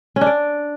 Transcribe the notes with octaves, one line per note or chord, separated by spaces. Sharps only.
C#4
D4
D5